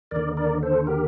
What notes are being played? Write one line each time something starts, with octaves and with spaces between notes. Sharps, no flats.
D#2 D3 A#4 D5
A#4 D5
A4 C5
G4 A#4